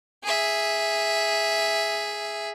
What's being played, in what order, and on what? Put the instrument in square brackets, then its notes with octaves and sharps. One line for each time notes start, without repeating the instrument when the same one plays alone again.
[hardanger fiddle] G#4 E5